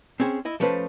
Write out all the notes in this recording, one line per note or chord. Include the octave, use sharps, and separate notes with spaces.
C4 C#4 G#4 C5
E4 D#5
F3 A3 C#4 B4 C5